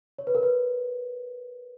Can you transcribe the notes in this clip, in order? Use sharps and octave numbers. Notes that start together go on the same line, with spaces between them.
C#5
B4
A#4
B4